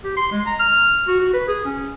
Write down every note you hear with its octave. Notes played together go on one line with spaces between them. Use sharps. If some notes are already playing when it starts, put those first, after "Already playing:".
G4
C6
G#3
A#5
F6
F#4
F#4
B4
G#4
C#4